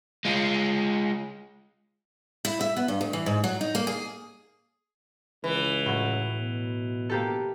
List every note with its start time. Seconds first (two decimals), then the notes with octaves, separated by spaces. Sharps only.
0.25 G#3 F4
2.45 E4
2.61 E5
2.76 B3
2.88 G2
3.01 D2
3.13 E3
3.26 G#2
3.44 F#3
3.61 D#4
3.75 A#3
3.87 G#4
5.44 C#2 E3
5.86 A2 F#3
6.37 B2
7.10 A#3 G4 A4